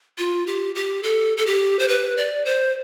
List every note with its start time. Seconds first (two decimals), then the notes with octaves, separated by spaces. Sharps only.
0.18 F4
0.47 G4
0.75 G4
1.03 A4
1.37 A4
1.46 G4
1.79 C5
1.88 B4
2.17 D5
2.45 C5